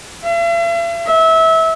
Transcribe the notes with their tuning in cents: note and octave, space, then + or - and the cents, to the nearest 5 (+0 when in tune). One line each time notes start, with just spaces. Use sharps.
E5 +45
E5 -25